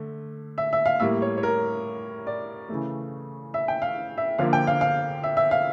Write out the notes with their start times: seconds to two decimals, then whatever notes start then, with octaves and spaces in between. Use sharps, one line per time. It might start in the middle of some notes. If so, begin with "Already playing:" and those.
Already playing: D3 A3
0.58 E5
0.73 E5
0.86 F5
1.00 A2 G3 A#3 E5
1.22 C#5
1.37 C#5
1.43 A#4
2.27 D5
2.69 C#3 E3 A3
3.54 E5
3.68 G5
3.82 F5
4.18 E5
4.38 D3 F3 A#3 F5
4.53 G5
4.67 F5
4.81 F5
5.23 E5
5.37 E5
5.51 F5